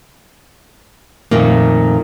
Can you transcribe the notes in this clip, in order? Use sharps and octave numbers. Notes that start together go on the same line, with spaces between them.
F2 A#2 D#3 A3 A#3